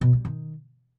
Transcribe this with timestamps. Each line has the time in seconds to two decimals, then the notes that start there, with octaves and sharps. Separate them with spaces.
0.01 B2
0.13 G3
0.25 D#3